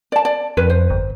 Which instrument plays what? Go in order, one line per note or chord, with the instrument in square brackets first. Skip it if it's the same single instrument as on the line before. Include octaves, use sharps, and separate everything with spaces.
[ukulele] D5 A5
D5
[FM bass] F2 [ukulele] B4
[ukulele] C5
[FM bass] G1